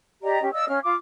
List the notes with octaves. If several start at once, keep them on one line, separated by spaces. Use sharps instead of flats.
G4 D5 D#5 A#5
C#4 G4
D5 D#5 F5 E6
C#4 F5 F6
F4 D6